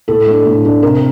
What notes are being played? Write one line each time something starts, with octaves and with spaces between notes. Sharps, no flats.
A2 A4
A3 D4
A2
A3 D4
C3 A#4